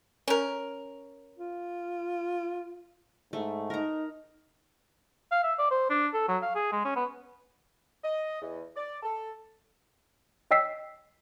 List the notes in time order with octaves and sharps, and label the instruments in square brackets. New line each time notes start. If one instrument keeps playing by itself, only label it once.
[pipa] C#4 A#4
[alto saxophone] F4
[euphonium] G#2 [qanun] A3
[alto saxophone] D#4 [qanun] A#4 A#5
[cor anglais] F5
E5
D5
C5
D4
A4
F#3
F5
G#4
G#3
C#4
B3
[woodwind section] D#5
E2
D5
A4
[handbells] C#5 D#5 G5 E6 B6 C7